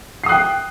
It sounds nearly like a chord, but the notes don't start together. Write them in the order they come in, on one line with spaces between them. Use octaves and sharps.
C7 D#6 F#6 G5